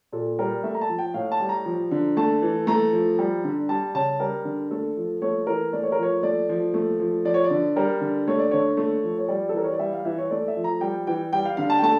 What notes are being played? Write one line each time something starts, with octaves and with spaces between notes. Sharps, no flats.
A#2 A4
G3 A#4
A3 E5
A#5
A5
F3
G5
A2 F5
A5
G3
A#5
F3
D3
A3 A5
E3
A3 A#5
F3
G3
D3
G3 A5
C#3 A5
G3 A#4
D3
A3 A4
F3
A3 C#5
E3 A#4
A3 D5
C#5
A#4
F3 C#5
A3 D5
F3
A3
F3
F3 D5
C#5
D5
D3
G3 A#4
D3
A3 C#5
D5
D3 C#5
A3
F3
C#5
G3 D5
A4
E3 A#4
C#5
D5
G3 E5
F5
E3 E5
C#5
A3 D5
E5
F3
A#5
G3 G5
E3 G5
G3 G5
F5
D3 F5
A5
G5
A3 A5